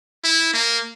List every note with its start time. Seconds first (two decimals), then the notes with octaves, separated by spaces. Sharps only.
0.24 E4
0.53 A#3